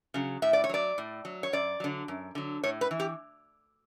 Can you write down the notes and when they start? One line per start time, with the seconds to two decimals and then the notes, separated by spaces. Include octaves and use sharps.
0.14 C#3 F#3
0.42 A2 E5
0.53 D5
0.64 C#5
0.69 F#3 D5
0.98 A2
1.25 F#3
1.43 C#5
1.53 F#2 D5
1.80 D3 F#3
2.08 F#2
2.35 D3 F#3
2.63 A2 C#5
2.81 B4
2.91 E3
3.00 G4